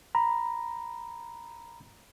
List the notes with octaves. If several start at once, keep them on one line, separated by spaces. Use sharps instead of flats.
A#5 B5